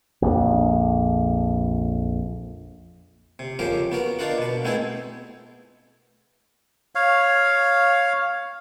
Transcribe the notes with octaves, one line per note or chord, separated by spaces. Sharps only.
A#1 F2
C3
F2 C#3 F3 G4 A#4
B3 F#4 A#4
D4 D#4 F4 A#4 F#5
B2 B4
A3 B3 C4 D#4 E4 G#4
C#5 F5